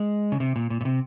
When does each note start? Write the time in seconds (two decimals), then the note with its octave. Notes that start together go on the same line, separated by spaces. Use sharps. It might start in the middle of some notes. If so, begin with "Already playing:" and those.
Already playing: G#3
0.32 C#3
0.40 C3
0.56 A#2
0.70 A#2
0.81 A#2
0.85 C3